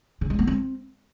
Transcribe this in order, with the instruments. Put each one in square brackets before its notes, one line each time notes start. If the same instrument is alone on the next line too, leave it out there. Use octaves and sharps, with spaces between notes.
[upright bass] C#3
G#3
B3
C4